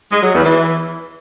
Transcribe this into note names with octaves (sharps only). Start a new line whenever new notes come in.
G#3
F#3
E2
E3